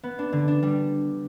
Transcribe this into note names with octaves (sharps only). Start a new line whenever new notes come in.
B3
D4
D3
D4
G3